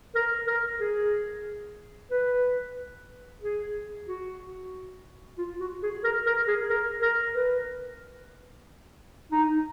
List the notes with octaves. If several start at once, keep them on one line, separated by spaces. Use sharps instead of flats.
A#4
A#4
G#4
B4
G#4
F#4
F4
F#4
G#4
A#4
A#4
G#4
A#4
A#4
B4
D#4